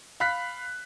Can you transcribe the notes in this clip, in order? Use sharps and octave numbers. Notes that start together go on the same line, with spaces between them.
F5 B5 F#6 B6